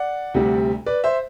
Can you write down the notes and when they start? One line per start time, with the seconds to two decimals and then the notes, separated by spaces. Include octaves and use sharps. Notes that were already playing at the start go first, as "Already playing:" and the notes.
Already playing: D5 F#5
0.34 D2 C3 G3
0.86 B4 D5
1.04 C5 E5